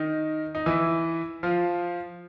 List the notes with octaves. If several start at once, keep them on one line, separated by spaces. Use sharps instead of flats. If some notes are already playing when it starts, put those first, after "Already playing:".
Already playing: D#3 D#4
D#4
E3 E4
F3 F4